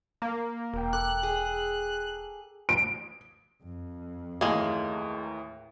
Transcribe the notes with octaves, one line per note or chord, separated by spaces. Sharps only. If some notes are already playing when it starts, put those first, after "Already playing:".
A#3
E1 A#4 G5
A4 A#5 D6 F#6
G#4
D7
F2
D#2 A2 E3 G#3 A#3